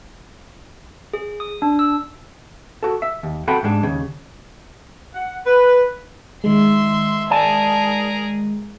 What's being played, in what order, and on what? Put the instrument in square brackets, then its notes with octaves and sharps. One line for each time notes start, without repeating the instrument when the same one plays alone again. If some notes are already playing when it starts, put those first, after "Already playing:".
[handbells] G#4
D#6
D4
E6
[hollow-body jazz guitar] F#4 A4
E5
D#2
C4 F#4 A4 F#5 G5 B5
G#2 G3 G#3 D4
D#2 C#3
[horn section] F#5
B4
[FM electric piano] D#3 G#3 [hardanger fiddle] E5 C6
[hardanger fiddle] G#4 A#4 [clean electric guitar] D5 G#5 A5